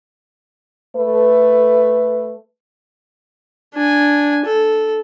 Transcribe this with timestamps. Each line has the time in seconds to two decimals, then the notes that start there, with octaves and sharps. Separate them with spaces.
0.96 A3 A4 B4
3.75 D4 G#5
4.46 A4